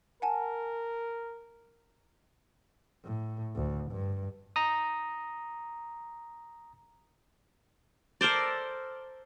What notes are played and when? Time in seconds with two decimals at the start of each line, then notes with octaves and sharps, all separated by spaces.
0.22 A#4 F#5 G#5 A5
3.04 A2
3.55 D2
3.91 G2
4.56 A#5 D#6
8.21 A4 A#4 C5 D5